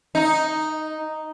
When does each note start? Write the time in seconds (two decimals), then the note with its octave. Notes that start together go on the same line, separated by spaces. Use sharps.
0.15 D#4